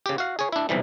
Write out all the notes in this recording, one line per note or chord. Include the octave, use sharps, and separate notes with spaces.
C#3 G4
F#4 F5
G#4 C#5
D4 E4
B1 C3 E3 G3